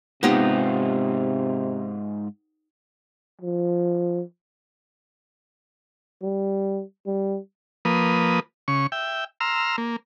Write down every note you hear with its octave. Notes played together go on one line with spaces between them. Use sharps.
G#2 C3 B3 D#4 F4 G4
F3
G3
G3
F3 A#3 B4 D#6
C#3 C#6
E5 G5
A#5 C6 E6 F6
A#3